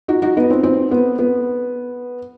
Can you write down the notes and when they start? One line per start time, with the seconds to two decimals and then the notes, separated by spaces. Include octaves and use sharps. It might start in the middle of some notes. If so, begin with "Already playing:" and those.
0.08 D#4 F#4
0.22 D#4 F#4
0.37 B3 D#4
0.50 C4
0.63 C4
0.91 B3
1.19 B3